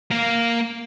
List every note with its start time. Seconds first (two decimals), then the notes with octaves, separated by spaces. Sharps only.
0.11 A#3 F5